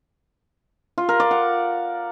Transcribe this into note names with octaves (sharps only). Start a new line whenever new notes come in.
F4
A#4
D5
F#5